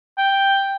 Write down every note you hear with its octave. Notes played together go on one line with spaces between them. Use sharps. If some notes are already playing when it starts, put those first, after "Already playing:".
G5